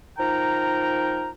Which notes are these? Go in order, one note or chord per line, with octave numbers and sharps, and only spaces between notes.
F3 D#4 A#4 G5 A#5